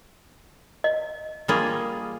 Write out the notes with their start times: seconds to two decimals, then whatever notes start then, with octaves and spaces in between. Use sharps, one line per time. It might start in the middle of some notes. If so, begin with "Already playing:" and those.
0.84 D#5
1.48 G3 A#3 F4 G#4